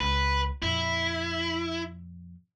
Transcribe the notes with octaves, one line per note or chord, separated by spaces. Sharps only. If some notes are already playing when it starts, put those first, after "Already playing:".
C#2 B4
F2 A#2 E4